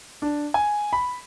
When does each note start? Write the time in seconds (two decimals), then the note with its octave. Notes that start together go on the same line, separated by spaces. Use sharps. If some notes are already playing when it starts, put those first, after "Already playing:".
0.22 D4
0.54 G#5
0.93 B5